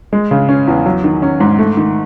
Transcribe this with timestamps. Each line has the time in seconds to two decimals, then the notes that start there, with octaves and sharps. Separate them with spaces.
0.13 G#3
0.31 C#3
0.49 C#4
0.68 E2
0.86 F#3
1.04 D#3
1.22 C#4
1.40 G#2
1.59 A3
1.77 D#3